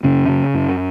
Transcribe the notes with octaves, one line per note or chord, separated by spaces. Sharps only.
F#2 C#3 C#4
C#3
F#2